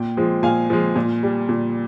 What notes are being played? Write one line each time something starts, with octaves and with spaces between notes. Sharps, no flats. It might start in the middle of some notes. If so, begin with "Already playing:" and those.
Already playing: A#2 G5
F3 G#3
A#2 F5 G#5
F3 G#3
A#2
G3
A#2